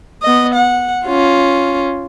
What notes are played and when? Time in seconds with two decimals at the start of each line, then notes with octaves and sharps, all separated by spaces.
0.23 B3 D#5
0.55 F#5
1.06 C#4 F4